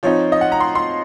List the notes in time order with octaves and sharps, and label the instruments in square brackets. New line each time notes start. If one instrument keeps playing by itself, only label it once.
[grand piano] F3 C4 D#4 C#5
D#5
F#5
A#5
C6
C6